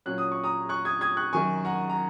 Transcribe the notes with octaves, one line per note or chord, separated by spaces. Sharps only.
A#2 F#3 C#4 F#6
D#6
C#6
A#5 D#6
C#6 F#6
D#6 G#6
D#6 G#6
C#6 F#6
F#2 D#3 F#3 G#5 C#6
F#5 A#5
A#5